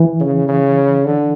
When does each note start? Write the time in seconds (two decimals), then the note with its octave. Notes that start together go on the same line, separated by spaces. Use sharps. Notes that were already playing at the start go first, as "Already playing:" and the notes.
Already playing: E3
0.20 C#3
0.48 C#3
1.05 D3